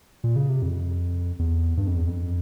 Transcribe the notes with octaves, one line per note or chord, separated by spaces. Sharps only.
A#2
C#3
C3
F2
E2
G2
F2
E2
F2